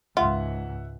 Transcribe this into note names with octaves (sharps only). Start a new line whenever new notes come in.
C#2 G#2 F4 E5 F#5